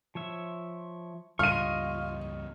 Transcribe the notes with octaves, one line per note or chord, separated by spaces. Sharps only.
F3 C#5 E5
C#2 G2 G3 F4 D#5 C#6 F6 D#7